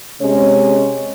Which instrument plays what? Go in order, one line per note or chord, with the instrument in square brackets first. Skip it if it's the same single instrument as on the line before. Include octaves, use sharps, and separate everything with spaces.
[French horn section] C3 G#3 C#4 C#5